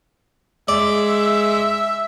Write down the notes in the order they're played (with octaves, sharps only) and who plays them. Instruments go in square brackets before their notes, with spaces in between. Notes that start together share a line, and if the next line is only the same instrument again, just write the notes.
[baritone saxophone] G#3 [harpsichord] D5 [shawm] E5